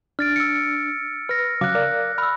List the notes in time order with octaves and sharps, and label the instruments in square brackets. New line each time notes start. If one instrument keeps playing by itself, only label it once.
[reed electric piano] D4 [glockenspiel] F6 A6 D7
[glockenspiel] E6 C#7
[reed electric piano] B4 [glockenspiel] F6 A#6
[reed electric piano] C#3 F#3 F5 [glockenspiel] D6 F#6
[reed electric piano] A#4 D5 F5
[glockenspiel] B5 E6 [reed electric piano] F6